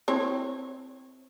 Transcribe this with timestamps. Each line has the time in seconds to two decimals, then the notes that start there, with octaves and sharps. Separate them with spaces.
0.08 C4 E4 C#5